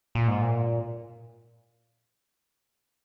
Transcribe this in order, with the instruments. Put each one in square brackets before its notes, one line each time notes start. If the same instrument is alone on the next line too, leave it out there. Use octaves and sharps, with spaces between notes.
[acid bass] A#2
G#2
A#2